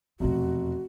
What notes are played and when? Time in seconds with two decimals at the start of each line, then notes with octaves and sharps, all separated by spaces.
0.20 F1 E2 B2 F#4